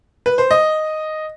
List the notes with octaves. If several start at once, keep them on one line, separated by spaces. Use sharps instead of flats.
B4
C5
D#5